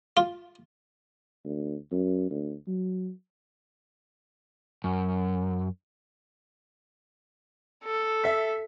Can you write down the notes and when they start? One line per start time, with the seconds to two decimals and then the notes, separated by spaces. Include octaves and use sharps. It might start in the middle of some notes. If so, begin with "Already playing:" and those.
0.17 F4
1.45 D2
1.92 F#2
2.31 D2
2.67 F#3
4.84 F#2
7.84 A4
8.24 E5 B6